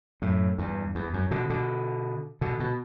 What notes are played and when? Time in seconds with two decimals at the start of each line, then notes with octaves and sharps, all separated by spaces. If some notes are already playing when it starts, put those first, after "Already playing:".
0.22 F#2 A2
0.58 E2 G2
0.95 E2
1.14 F#2
1.31 B2 D3
1.50 B2 D3
2.41 B2 D3
2.60 B2